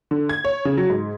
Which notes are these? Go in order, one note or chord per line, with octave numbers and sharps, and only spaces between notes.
D3
G#6
C#5
C#3
F#3
G#2